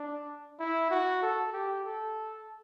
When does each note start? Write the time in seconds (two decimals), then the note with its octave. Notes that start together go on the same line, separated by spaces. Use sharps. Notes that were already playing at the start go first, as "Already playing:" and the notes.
Already playing: D4
0.59 E4
0.91 F#4
1.22 A4
1.53 G4
1.85 A4